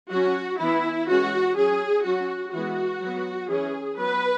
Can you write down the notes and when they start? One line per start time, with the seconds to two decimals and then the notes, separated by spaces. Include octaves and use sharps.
0.11 F#3 C#4 F#4
0.59 E3 B3 E4
1.08 E3 G#3 C#4 F#4
1.56 F#3 C#4 G#4
2.04 F#3 C#4 F#4
2.52 E3 G#3 B3 F#4
3.01 F#3 B3
3.49 E3 C#4 G#4
3.97 F#3 B3 B4